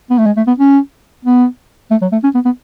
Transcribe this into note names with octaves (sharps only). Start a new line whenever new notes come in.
B3
A3
G#3
A3
B3
C#4
B3
A3
F#3
A3
C#4
B3
B3